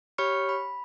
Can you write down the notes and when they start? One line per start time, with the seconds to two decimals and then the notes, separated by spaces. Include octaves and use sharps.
0.18 G4 C#5 B5 C#6 F6 C#7
0.49 B5